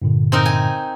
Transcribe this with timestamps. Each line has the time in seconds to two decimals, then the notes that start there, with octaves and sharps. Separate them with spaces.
0.02 G2 A#2 D3
0.32 C4 D#4 A#4
0.46 G#5